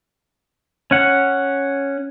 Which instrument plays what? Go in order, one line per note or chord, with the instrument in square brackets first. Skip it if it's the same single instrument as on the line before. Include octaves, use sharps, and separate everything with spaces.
[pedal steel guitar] C#4 F#5